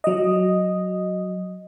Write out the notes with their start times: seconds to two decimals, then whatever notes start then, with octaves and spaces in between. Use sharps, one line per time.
0.04 F#3 D#5